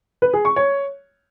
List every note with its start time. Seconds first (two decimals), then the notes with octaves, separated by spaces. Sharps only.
0.22 B4
0.33 G#4
0.45 C#6
0.56 C#5